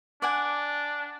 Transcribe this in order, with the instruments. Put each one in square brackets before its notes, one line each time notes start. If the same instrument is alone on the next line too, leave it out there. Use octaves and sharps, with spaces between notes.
[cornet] D4 [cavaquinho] D5 F#5 G#5